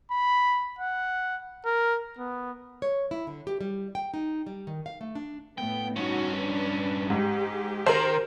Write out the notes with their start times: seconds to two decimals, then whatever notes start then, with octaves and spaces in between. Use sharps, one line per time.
0.11 B5
0.79 F#5
1.65 A#4
2.18 B3
2.82 C#5
3.11 E4
3.27 D3
3.47 G4
3.61 G3
3.95 G5
4.14 D#4
4.46 G3
4.67 D#3
4.86 F5
5.01 A3
5.15 D4
5.58 A2 A3 B3 G5
5.96 G2 C#4 D#4 F#4
6.36 D4 B4
7.10 G#2 G4 G#4
7.86 D#3 A#4 C5